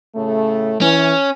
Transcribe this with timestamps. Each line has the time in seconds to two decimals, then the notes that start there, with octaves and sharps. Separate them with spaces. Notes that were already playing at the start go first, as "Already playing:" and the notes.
0.16 A2 C#3 A3
0.81 E3 C#4